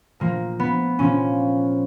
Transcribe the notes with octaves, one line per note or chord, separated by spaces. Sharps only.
A#2 F3 A#3
B3
A#2 F3 C#4